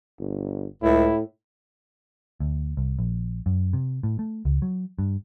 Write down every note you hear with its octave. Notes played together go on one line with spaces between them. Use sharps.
G1
C#2 A2 E4
D2
C2
A#1
F#2
C3
A2
A3
C#2
F#3
G2